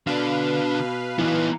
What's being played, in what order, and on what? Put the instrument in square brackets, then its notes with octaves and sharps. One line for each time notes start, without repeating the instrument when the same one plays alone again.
[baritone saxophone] B2 [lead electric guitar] D3 D4 [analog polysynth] B4 F5
[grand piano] E3 [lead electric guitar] B3 D#4